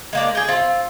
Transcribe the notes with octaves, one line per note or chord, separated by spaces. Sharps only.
G#3 A#3 D4
G#4 G5
C4 F4